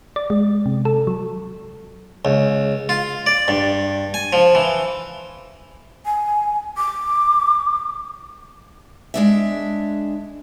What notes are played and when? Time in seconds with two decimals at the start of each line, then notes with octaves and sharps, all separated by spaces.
0.16 D5
0.30 G#3
0.66 C3
0.85 A4
1.07 F#3
2.25 C#2
2.89 F4
3.26 D5
3.48 G2
4.14 G#5
4.33 F3
4.55 E3
6.05 G#5
6.77 D6
9.14 G#3 D4 E5